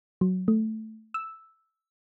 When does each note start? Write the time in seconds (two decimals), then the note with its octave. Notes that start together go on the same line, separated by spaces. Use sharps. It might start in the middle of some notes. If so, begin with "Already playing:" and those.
0.21 F#3
0.48 A3
1.14 E6